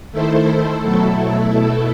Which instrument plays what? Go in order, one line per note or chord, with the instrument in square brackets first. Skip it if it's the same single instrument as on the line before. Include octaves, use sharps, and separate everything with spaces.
[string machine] D#3 A3 E4 A4 C5
B2 F#3 A3 E4 A4
B2 A3 E4 A4